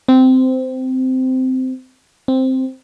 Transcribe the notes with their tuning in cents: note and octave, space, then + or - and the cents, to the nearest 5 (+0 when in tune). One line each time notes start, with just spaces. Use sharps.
C4 -15
C4 +0